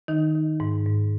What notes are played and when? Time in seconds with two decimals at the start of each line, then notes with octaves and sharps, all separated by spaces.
0.08 D#3 D#4
0.35 D#3
0.60 G#2
0.86 G#2